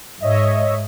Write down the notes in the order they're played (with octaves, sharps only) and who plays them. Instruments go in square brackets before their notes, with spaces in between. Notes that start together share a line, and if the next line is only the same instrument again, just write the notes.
[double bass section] G#2 [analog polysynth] C#5 D#5 E5